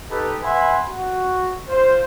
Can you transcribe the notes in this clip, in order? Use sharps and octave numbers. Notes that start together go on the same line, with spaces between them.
D#4 G4 A4 B4
B4 E5 F#5 G#5 B5 C6
F#4
F4 C5